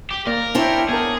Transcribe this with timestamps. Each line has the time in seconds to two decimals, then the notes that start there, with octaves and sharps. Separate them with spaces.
0.11 G4
0.27 A#3 A#4 D5
0.55 D4 E4 C5 C#5 G5
0.89 B3 G#4 A#4 A5